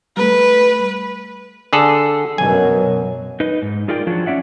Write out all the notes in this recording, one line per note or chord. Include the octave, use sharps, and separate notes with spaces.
G3 A3 B4
D3 G#4 A4
F#2 B2 F#3 G#5
D#4 B4 D#5
G#2
D#4 F4 G#4 A#4 D5 G5
F3 F#3 D4 F4 F#4 G#4
C#4 D5 E5 F#5